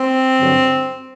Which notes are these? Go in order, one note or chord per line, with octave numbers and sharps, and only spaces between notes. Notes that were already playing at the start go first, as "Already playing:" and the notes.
Already playing: C4
G2 D3 F#3